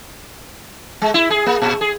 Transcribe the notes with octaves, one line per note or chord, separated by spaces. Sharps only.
G#3
E4
G#4
A#3
A#2
G#4